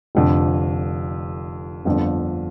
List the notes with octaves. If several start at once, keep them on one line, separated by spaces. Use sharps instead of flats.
F1 F2 D3
G1 F2 D3